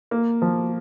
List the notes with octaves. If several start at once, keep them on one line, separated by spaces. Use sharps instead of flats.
A#3
F3